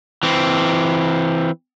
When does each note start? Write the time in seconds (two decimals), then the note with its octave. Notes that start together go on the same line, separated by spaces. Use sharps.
0.23 E3 C4